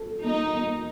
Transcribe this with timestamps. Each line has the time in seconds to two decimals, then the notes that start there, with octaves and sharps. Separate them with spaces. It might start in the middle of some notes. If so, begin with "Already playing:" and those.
Already playing: A4
0.24 A#3 D#4
0.54 A#3